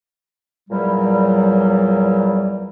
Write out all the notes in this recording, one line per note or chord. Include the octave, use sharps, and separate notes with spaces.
E2 A#2 F#3 G3